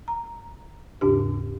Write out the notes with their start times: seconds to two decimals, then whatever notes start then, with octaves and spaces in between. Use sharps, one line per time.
0.08 A#5
1.01 D#2 G#2 C#3 D4 G4